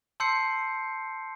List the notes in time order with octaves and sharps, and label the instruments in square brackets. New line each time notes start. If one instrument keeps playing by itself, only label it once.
[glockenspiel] A5 C6 E6 G6 C7 C#7